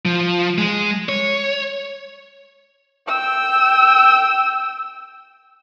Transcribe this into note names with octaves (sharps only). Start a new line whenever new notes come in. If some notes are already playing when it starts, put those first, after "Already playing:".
F3
G#3
C#5
G5 E6